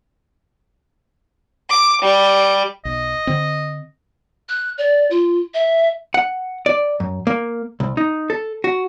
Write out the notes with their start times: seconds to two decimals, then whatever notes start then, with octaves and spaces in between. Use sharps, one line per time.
1.70 D6
2.03 G3
2.85 B1 D#5
3.27 D3 C4
4.49 F#6
4.78 D5
5.11 F4
5.54 E5
6.14 F#5
6.66 D5
7.00 F#2
7.27 A#3
7.80 C2
7.97 D#4
8.30 A4
8.64 F#4